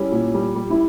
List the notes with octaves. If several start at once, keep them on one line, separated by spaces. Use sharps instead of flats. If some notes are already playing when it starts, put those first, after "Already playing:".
Already playing: G3 C#4 E4
A#2
G3
G3
E4